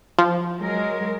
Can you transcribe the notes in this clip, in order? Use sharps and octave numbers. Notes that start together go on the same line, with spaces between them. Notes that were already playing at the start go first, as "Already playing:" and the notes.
F3
F#3 G#3 A#4